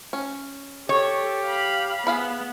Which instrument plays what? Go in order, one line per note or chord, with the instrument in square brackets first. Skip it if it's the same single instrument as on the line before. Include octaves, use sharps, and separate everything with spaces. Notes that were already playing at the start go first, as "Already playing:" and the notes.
[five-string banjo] C#4
[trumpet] G4 [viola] A4 [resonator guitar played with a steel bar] C#5
[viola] F5 B5
[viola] B3 [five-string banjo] G#4 F5 B5